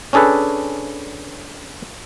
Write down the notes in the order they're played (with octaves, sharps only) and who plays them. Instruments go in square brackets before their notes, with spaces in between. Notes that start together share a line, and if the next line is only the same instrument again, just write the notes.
[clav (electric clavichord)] C#4 D4 G#4 A4 B4